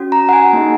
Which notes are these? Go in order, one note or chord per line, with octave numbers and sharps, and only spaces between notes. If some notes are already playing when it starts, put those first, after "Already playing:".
Already playing: C#4 F#4
A#5
F#5
G#5
A#3 D#4 G#4